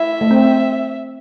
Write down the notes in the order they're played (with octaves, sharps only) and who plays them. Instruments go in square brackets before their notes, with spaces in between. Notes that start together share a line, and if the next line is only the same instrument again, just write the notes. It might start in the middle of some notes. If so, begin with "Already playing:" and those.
Already playing: [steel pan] E4 [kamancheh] E5
[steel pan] A3
C4